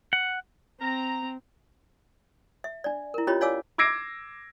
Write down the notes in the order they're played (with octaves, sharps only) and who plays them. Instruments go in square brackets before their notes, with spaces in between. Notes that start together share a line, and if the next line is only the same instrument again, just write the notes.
[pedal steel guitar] F#5
[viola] C4 [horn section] A#5
[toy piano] E5
D4 D5
E4 A#4
C#4 F4 G4 C#5 D#5 B5
C#5 D5 F5 G#5 D6 E6
[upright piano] D6 E6 G#6 A#6 C7 D7